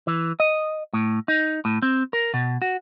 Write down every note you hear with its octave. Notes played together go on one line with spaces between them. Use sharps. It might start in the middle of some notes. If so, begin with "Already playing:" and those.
E3
D#5
A2
D#4
A2
C4
A#4
B2
F#4